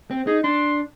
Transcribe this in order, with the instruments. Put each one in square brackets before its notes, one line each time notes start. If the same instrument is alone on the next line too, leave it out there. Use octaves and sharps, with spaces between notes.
[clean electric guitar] C4
[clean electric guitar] D#4 [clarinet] G#4
[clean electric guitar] D4 [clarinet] C6